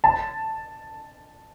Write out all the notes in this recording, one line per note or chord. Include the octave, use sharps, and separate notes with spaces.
A5